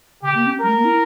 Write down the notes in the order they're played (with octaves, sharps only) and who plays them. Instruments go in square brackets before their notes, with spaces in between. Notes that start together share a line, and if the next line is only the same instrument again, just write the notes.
[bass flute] C#3 [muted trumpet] G4
[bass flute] A#3
C#4
[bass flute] G3 [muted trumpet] A#4
[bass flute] A3
A#3
E4